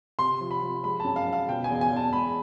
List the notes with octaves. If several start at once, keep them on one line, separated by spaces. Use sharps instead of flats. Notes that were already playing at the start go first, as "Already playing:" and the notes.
C3 C6
F3
B5
F3
G#3 B5
F#2 A5
F5
F#2
F5
B2 G5
G#5
E2
G#5
E2 A5
G#3 B5